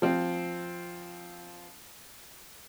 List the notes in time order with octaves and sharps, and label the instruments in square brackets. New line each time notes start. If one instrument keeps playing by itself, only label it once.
[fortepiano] F3 C4